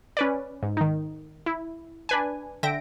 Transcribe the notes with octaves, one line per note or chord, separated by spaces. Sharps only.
C#4 B4 D5
G#2
D#3 D#4
E4
D4 B4 G#5
D3 E5 G5 A#6 D7